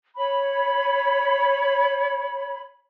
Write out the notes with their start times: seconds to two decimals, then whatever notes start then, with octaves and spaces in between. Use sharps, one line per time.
0.17 C#5 B5